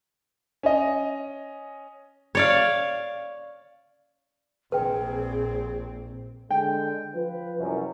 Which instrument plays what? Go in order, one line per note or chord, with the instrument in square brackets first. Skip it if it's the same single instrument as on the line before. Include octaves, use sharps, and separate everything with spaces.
[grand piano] C#4 D#5
[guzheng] C#5 D5 F5
[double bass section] A#1 C4 [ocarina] G#4 [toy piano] B4 G5
[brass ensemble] D3 G#3 [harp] G5
[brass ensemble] F3 F4 B4
C2 F#2